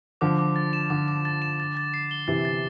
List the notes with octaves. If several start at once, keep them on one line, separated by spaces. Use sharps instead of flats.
D3 F3 D6
D6
A6
E7
D3 D6
D6
A6
E7
A6
A6
C7
G7
C3 E3 A6
A6